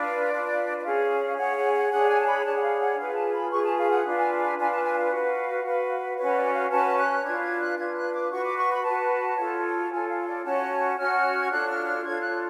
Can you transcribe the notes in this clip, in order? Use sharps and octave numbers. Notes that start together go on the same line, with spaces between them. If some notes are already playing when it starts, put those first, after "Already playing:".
Already playing: D4 F4 B4 D5
D4 F4 B4
D5
C#4 G#4 C#5 F5
C#4 G#4 C#5 F#5
F#5
F#5
D4 G#4 C#5 F#5
G#5
A5
B5
D4 G#4 C#5 A5
F#5
F5
F#5
F4 G#4 B4 F5
A5
B5
F4 G#4 B4 C#6
A5
F5
F#5
D4 F4 B4
G#5
G#5
D4 F4 B4 G#5
A5
G#5
F5
F#4 B4
F#4 B4
C#4 F#4 B4 C#5
D5
F5
C#4 F#4 B4 A5
F#6
D4 F4 B4 G#6
G#6
F#6
D4 F4 B4 G#6
F#6
D6
F#4 B4 C#6
D6
C#6
B5
F#4 B4 A5
F4 A4 C#5
F4 A4 C#5 G#5
F5
D5
C#4 F#4 C#5 A5
C#4 F#4 C#5 F6
G#6
D4 F4 A4 C#5 F#6
F6
F6
D4 F4 A4 C#5 G#6
F#6